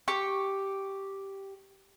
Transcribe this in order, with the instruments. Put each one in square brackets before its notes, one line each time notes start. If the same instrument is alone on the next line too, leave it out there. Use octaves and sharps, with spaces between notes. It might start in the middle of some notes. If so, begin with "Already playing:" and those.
[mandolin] G4 C#6